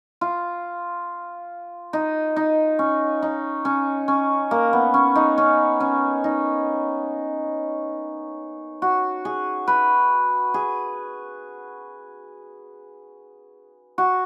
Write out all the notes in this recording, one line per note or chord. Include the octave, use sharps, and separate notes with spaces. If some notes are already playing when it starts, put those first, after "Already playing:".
F4
D#4
D#4
C#4
D#4
C#4
C#4
A#3
B3
C#4
D#4
C#4
C#4
D#4
F#4
G#4
B4
G#4
F#4